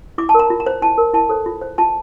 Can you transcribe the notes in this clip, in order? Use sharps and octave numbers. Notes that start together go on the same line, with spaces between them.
E4 D6
A5
A#4 A#5
F4
A#5
C5
E4 A5
A#4
E4 A5
A4 C5
F4
C5
F4 A5